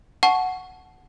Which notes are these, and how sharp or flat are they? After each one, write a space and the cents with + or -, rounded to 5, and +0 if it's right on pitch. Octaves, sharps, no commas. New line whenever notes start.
F#5 +0 A5 -20 C#6 +0